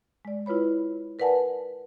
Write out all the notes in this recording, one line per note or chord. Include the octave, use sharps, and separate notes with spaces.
G#3 D5
E4 F4 B4 C#5 B5
A#4 B4 D5 F#5 G#5 A5